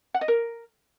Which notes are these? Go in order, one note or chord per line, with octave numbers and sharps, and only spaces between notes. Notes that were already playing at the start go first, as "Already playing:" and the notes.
F#5
D#5
A#4